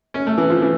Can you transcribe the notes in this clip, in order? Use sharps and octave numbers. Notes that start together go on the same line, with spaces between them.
C#4
A3
E3
F3
E3